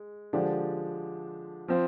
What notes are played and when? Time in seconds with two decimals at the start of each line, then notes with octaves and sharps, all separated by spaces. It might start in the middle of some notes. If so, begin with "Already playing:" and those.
Already playing: G#3
0.33 D3 F3 G#3 D4 G4
1.68 F3 C4